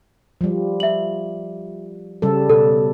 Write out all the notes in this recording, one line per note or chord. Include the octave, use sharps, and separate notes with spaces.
F3 G3
E5 F#7
C#3 G3 A4
B2 A4